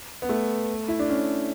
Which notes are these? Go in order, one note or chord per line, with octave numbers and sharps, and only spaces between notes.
B3
A3
E4
D4
C#4